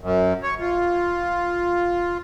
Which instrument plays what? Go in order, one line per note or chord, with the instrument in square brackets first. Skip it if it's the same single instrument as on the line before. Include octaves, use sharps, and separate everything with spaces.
[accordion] F#2
C#5
F4